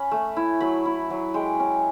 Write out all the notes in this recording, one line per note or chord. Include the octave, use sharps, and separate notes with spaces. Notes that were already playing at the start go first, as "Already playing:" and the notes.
Already playing: C#4 B5
A3
E4
F#3 B5
E4
F#3
G#3 G5
C#4